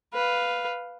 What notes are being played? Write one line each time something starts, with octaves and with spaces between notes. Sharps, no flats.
B4 F5